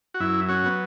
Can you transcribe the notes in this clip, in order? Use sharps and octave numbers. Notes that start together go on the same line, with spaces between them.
F#4
F#2 E4
C#4 F#4
F#3 B3